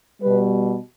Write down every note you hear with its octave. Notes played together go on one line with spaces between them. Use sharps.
B2 G3 B4